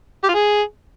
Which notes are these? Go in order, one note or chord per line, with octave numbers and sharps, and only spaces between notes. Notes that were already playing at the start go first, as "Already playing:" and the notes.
G4
F4
G#4